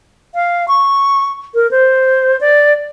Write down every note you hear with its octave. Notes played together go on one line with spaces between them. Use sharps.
F5
C#6
A#4
C5
D5